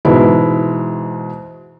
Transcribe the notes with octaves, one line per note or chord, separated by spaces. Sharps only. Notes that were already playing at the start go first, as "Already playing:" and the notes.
G#2 B2 E3 G#3 E4